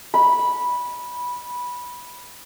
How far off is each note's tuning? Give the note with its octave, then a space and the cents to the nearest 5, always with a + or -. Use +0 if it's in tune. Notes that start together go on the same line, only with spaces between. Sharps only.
B5 -10